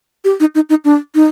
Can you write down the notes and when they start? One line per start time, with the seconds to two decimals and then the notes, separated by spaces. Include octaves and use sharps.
0.25 G4
0.40 D#4
0.55 D#4
0.69 D#4
0.85 D4
1.15 D#4